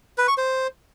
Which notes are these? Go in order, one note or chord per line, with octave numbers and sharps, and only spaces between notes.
B4
C#6
C5